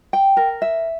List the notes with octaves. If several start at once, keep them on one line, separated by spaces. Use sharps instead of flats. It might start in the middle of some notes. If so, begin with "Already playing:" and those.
G5
A#4
E5